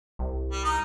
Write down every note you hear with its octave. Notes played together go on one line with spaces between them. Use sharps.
C2
G3
D#4 A#4 D#6